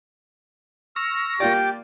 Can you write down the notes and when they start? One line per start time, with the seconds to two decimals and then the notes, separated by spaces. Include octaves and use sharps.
0.96 C#6 E6 F6 A#6
1.40 A#3 F4 G4 D5 D6